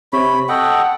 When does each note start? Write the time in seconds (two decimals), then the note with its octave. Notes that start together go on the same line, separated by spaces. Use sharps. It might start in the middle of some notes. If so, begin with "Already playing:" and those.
0.13 C3 C#5 B5
0.49 A4 D#5 F#5 G5